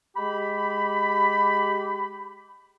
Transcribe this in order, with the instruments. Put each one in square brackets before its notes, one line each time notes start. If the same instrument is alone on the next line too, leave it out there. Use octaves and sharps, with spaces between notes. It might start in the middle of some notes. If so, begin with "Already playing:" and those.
[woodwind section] G#3 G4 B5